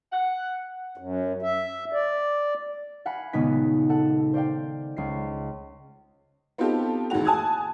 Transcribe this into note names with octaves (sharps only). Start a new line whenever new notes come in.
F#5
F#2
E5
D5
F5 F#5 G#5 B5
D#1 C#3 G#3 B3 D#4 B6
A4 F#5
C5 D5 F5 G5
C#2 C7
B3 C4 D#4 F4 G4 A4
A1 A2 D#3 G#3 F#4 F7
G#5 A5 D#6 F#6 G#6